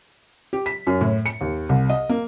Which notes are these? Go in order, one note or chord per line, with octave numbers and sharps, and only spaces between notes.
G4
B6
F#2
A2
C#7
D#2
C2
D#5
A#3